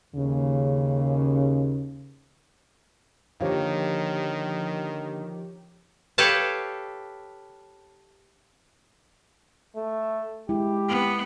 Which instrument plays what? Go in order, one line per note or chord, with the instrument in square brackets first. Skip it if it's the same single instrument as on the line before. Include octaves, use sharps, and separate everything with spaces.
[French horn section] D#2 C#3
[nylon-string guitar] D3 A#3 F5 [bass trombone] D#3 [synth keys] F3 G4 [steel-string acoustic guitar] C#5
[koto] G4 A4 B4 C#5 F5 A5
[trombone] A3
[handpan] G#3 E4 [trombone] G4
[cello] B3